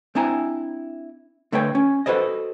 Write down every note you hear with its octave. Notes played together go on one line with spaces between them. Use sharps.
C4 D4 E4 G#5 A#5
D3 A3 B4 C#5 G5
C#4
F#4 A4 B4 C5 D#5